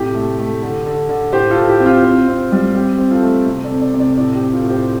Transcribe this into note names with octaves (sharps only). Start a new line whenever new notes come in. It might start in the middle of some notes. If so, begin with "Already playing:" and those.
Already playing: A2 C3 G4
A3
A3
D3
D3
D3
A2 G4 C5
F4 A4
A2
G4
C4
F4
C4
C4
G3
C4 G4
C4
F4 A4
A3
C3
A4 D5
C4
A4 D5
C3
A4 D5
A2 A4 D5
G4
C4
F4 A4
A2
G4 C5